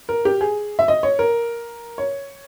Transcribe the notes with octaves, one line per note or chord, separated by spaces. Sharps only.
A#4
G4
G#4
E5
D#5
C#5
A#4
C#5